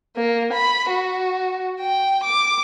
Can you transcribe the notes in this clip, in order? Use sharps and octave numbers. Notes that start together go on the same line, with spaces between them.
A#3
B5
F#4
G5
D6